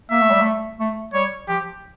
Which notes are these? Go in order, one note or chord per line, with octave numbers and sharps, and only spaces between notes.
A#3 E5
A3
G3
A3
A3
G3 C#5
F3 G4